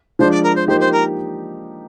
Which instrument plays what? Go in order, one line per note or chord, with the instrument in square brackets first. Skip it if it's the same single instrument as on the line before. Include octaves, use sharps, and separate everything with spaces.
[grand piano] F3 G#3 D4 [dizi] C5
[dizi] D5
A#4
C5
[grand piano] F3 A#3 D#4 G4 [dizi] C5
[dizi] C5
A#4